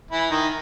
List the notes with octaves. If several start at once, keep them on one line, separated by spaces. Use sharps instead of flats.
E3 E4
D#3 D#4